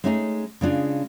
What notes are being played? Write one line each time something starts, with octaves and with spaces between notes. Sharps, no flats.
G#3 A3 C#4 D#4 F#4 G#4
C#3 G#3 D4 F4